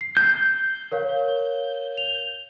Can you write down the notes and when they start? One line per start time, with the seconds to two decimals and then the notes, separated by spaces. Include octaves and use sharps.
0.01 C7
0.17 G6 C7
0.92 A#4 C#5 F5
1.97 F7